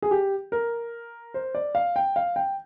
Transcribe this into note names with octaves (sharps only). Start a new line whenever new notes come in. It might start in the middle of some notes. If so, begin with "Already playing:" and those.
G#4
G4
A#4
C5
D5
F5
G5
F5
G5